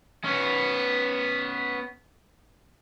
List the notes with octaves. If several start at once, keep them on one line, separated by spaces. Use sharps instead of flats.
B3 C#4